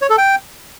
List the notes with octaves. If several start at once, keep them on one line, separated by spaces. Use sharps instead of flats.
C#5
A4
G5